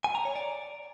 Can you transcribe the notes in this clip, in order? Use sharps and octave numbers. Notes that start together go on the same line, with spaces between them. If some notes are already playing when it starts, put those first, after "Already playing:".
G#5
A#5
C#5
D5